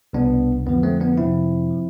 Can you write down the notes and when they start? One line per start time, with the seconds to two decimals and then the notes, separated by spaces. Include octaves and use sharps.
0.13 C2 B2 B3 D4
0.66 F2 D3 F3 B3
0.83 A3 C4
1.00 B3 D4
1.18 F2 C3 F3 C4 E4
1.70 F3